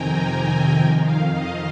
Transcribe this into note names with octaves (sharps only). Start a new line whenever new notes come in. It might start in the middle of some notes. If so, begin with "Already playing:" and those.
Already playing: F2 C3 D#3 G5 G#5 A#5
A#5
G#5
F2 D#3 G5
F5
D#5